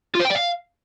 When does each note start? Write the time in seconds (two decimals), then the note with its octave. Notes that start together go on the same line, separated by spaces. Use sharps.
0.15 F4
0.20 C5
0.25 G5
0.30 D5
0.36 F5